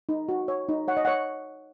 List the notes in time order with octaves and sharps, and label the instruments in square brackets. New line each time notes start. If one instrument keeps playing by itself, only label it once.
[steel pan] D#4
F#4
C#5
D#4
C#5 F#5
D#5
C#5 F#5